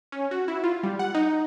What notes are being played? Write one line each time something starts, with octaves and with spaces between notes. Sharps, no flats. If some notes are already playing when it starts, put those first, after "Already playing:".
C#4
F#4
E4
F4
G3
F#5
D#4